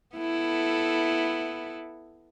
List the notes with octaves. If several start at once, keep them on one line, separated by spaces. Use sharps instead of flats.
B3 E4 A4